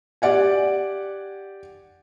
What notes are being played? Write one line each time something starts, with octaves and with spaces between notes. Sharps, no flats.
G4 D5 F#5 G#5